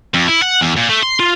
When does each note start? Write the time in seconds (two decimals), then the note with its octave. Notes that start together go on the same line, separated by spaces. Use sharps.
0.14 F2
0.28 E4
0.42 F#5
0.61 E2
0.76 A#2
0.89 A3
1.03 C6
1.20 F4